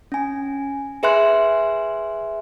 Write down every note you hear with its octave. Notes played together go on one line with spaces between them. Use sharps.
C#4 G#5
G#4 B4 E5 G#5 C6 F#6